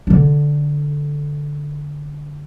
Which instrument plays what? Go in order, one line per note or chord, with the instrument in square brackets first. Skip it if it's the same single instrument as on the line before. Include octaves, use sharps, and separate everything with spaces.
[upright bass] D3 D4